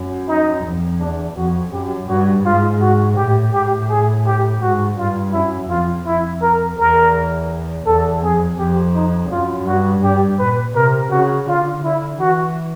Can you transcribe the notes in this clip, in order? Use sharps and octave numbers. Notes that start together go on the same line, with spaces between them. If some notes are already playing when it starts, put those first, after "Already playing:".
Already playing: F#2
D#4
F2
E2 D4
F2 F#4
F#2 G4
G2 F#4
G#2 F4
F#4
A2 G4
A2 G4
G#4
G4
G#2 F#4
G2 F4
F#2 E4
F2 F4
F2 E4
A#4
E2 A#4
E2 A4
F2 G#4
F2 G4
D#4
F#2 F4
G2 F#4
G2 G4
A#2 B4
C3 A#4
C#3 F#4
D3 F4
D3 E4
E3 F#4